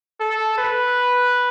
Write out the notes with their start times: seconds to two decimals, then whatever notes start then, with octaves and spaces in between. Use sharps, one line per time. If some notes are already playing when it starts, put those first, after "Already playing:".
0.20 A4
0.58 B4